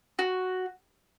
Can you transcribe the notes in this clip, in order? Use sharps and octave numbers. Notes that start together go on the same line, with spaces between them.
F#4